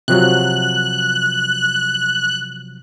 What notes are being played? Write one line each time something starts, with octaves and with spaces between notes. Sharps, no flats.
C3 F3 F#3 F#6